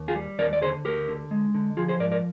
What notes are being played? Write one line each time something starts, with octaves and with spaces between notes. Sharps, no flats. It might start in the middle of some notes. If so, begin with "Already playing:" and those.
Already playing: D#2
F4 G#4
G3
D#2 A#4 D5
D5
D3 G#4 C5
D2 G4 A#4
D3
G#3
D3
F3 F4 G#4
G#4 C5
G#2 A#4 D5
A#4 D5